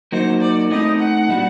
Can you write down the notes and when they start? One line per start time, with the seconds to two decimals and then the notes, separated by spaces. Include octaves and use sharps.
0.12 F#3 A#3 D#4 F#4 C5
0.41 D5
0.70 A2 F#3 A3 C4 D#4 D#5
0.99 F#5
1.28 A#2 G3 D4 F#4